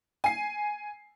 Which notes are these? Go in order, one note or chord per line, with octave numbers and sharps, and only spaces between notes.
G#5 C7